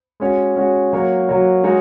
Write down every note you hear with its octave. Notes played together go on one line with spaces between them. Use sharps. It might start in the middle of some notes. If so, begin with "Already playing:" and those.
G#3 C#4 F#4 C#5
G#3 C#4 F#4 C#5
F#3 A#3 F#4 A#4 C#5
F#3 A#3 F#4 A#4 C#5
G#3 D#4 F#4 A#4 C#5